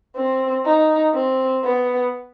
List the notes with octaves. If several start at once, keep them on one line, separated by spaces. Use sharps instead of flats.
C4
D#4
C4
B3